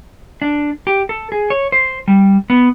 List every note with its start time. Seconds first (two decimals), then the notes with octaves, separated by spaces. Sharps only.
0.42 D4
0.87 G4
1.09 A4
1.32 G#4
1.50 C#5
1.72 C5
2.08 G3
2.50 B3